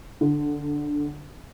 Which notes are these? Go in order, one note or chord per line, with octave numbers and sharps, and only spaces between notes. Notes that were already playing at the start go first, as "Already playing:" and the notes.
D3